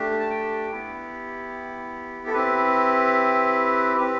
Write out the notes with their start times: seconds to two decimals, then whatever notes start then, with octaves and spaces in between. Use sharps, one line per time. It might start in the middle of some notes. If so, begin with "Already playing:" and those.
Already playing: A3 D4 G4
0.19 A5
0.30 G5
0.71 B3 E4 G4
2.27 A4
2.34 C4 E4 G4 B4
3.97 C4 G4 B4